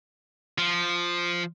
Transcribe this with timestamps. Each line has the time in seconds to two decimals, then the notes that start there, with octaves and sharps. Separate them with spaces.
0.58 F3